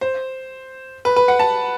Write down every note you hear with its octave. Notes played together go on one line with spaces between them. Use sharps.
C5
B4
B4
F#5
A5